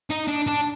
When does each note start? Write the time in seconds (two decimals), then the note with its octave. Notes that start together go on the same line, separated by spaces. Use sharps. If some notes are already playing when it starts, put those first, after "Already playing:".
0.10 D#4
0.28 D4
0.47 D4